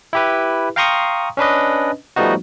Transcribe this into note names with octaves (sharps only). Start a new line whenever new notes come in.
E4 G4 B4
F5 G5 A#5 C6 C#6 D#6
C#4 D4 B4 D#5
F3 G3 A3 B3 D#4 F#4